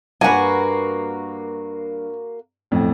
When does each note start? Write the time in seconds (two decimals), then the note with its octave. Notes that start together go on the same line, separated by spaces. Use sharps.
0.21 G2 A#3 F#4 B4 F#5 G#5
2.71 B1 F2 A2